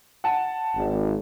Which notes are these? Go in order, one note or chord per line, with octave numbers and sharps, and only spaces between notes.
F#5 A5
G#1